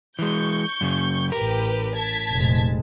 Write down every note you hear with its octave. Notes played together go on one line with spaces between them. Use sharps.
E3 G#3 C#6 G6
F#2 C#3
A1 A2 G4 A#4 B4
A5 G#6 B6
F1 A#2 G#3